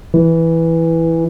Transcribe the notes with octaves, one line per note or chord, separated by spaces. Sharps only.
E3